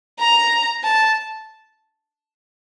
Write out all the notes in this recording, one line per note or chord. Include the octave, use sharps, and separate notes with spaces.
A#5
A5